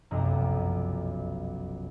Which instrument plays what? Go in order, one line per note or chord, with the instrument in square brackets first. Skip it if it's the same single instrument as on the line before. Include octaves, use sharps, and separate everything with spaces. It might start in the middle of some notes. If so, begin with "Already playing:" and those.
[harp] F1 B1 F#2 D#5 A#5 F6